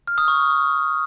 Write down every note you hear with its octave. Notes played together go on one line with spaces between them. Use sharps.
F6
D#6
C#6